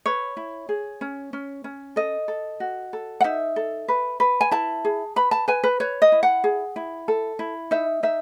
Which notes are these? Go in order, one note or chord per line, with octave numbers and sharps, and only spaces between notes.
B4 C#5
E4
G#4
C#4
C#4
C#4
A4 D#5
A4
F#4
A4
F#5
D#4 E5
A4
B4
B4
G#5
E4 A5
G#4
B4 B5
A5
B4 G#5
B4
B4 C#5
D#5
E4
F#5
G#4
E4
A4
E4
D#4 E5
D#4 E5